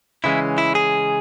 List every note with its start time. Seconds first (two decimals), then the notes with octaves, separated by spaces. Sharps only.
0.24 C#3 E3 G#3 C#4 E4
0.58 E4
0.75 G#4